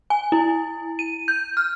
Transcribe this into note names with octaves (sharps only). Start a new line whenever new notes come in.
G#5
E4
D#7
G6
F6